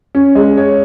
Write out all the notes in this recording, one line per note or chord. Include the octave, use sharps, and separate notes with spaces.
C#4
G#3
C#5